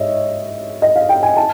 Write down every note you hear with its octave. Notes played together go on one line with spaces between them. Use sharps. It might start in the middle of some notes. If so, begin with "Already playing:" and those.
Already playing: G#2 C#5 D#5 E5
D#5
F5
G5
G#5
A5